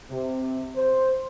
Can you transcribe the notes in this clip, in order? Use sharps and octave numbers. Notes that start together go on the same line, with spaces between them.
C3
C5